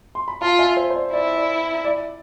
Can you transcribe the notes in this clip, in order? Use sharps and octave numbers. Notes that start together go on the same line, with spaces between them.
C6
B5
F4 F5 A5
E5 G#5
C5 E5
C5
D5
E4 D5
D5
D5